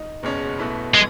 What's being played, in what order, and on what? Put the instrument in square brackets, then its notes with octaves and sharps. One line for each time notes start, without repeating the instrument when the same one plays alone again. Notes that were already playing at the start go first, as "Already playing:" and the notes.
Already playing: [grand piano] D#4
F#1 E2 B2 G#3 C#4
B1 B2 A3 E4 B4
[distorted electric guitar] G#3